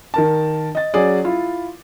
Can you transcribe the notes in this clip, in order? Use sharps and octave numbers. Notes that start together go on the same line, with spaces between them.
D#3 A#4 A5
D#5 A6
F#3 C#4 G#4 D5
E4 F4